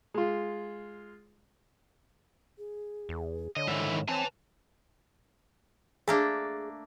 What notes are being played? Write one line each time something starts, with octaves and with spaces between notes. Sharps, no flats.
G#3 F4
G#4
E2
D3 C#5 D#5
G#2 D#3 E3 E5
C4 B4 C#5 G#5 A5
A3 A#3 D4 G#4